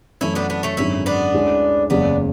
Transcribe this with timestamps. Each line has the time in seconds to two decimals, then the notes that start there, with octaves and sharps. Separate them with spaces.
0.21 F#2 E3 A3 C#4 E4
0.35 B3 D4
0.50 B3 D4
0.63 A3 C#4
0.77 G#1 F#2 D3 G#3 C#4 E4
1.06 B3 D4
1.34 D2 D3 G#3 C#4 E4
1.90 F#1 E2 C#3 G#3 B3 C#4 D4